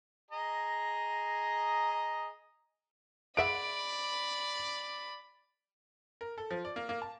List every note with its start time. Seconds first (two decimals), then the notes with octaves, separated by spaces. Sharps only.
0.31 G#4 D#5 A#5
3.37 G#3 D5 E5 F#5 B5 D7
6.21 A#4
6.38 A4
6.51 F3
6.65 D5
6.76 A#3
6.89 A#3
7.02 A5